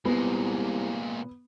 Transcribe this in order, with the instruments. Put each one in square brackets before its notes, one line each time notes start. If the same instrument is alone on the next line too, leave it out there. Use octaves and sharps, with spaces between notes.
[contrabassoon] C2 [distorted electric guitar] A#2 G#3 [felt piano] B3